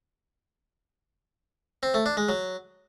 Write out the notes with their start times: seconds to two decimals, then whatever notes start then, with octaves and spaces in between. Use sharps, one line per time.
1.83 C4
1.94 A3
2.06 D4
2.17 G#3
2.29 F#3